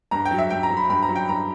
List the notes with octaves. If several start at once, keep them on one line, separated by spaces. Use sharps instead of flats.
G2 A#5
G5
F#3
E5
G2 G5
A#5
F#3
B5
G2 B5
A#5
F#3
G5
G2 A#5